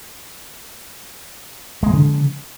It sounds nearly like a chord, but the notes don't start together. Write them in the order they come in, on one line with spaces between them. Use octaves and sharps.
G#3 A#3 F3 C#3